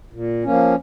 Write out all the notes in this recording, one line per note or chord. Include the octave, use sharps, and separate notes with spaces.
A#2
F3 A#3 C#4